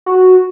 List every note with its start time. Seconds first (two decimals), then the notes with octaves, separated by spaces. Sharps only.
0.06 F#4